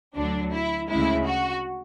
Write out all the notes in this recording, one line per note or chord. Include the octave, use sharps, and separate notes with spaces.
D2 D3 F#3 D4
E4
D2 C#3 G#3 E4
F#4